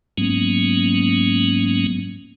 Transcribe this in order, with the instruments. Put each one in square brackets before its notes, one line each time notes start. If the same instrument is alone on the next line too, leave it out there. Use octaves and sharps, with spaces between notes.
[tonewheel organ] G#2 F#3 G#3 A#3 B3 C#4